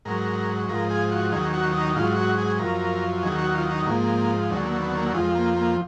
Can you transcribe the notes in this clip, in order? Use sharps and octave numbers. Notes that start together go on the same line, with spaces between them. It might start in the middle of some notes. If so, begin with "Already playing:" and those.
G#2 F#3 A#4
G#2 F3 A#4
G#4
F#4
D#2 D#3 F#3 G#4
F#4
D#4
G#2 F#3 F4
F#4
G#4
F#2 F3 A#4
D#2 D#3 F#3 G#4
F#4
F4
D#4
G#2 F3 A#3
D#2 D3 F#3 G#3
A#3
B3
A#3
F2 F3 G#3
A#3
A#3